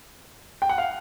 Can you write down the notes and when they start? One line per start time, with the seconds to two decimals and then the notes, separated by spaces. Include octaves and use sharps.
0.62 G5
0.69 F#5
0.78 F5